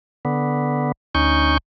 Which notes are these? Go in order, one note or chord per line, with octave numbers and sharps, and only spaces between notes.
D3 B3
D2 C#4 D#4 C#6 G6